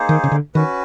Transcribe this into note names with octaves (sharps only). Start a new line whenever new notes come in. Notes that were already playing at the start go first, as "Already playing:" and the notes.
Already playing: A#3 D#4 G#4 C5
D#3
C#3
D3
D#3 C#4 F#4 B4